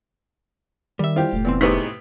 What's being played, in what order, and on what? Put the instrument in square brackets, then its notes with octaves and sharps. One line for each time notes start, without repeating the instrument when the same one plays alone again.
[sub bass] D#3 [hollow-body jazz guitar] G3 E5
[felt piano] E4 C5 [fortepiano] F4 G4
[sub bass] F1 [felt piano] A2
[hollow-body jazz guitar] A#2 E3 C4 [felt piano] B3
[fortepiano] A2 C3 B3 [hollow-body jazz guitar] D#4 G#4 [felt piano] C#6 B6